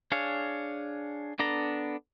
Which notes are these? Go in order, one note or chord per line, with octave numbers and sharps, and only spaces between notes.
D4 G#4 C#5 F5
B3 D4 A4 A#5